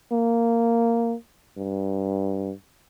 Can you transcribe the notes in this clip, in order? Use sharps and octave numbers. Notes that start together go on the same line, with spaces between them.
A#3
G2